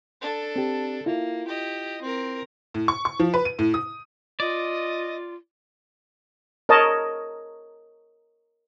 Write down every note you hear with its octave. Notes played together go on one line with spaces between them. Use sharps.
D4 A4
C4 G4
A#3 E4 F4
G4 D#5
C4 A#4
A2
C#6
C#6
F3
B4
D#7
A2
D#6
F4 D5 D#5
A#4 C#5 D#5 A5